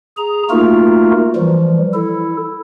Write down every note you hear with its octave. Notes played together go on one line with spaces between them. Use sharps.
G#4 A#5
A3 A#3 D#4 F4 F#4 A#4
E3 F3 G3
E4 A4